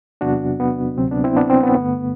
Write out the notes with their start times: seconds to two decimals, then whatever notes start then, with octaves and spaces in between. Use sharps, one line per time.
0.21 E2 C3 F#3 B3 D4 F#4
0.60 B3
0.98 D2 C3 F#3 C4
1.11 B3 D4
1.24 C4 E4
1.36 B3 D4
1.50 C4
1.63 B3
1.75 G2 D3 A3 B3